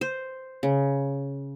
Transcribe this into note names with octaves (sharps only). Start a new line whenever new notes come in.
C5
C#3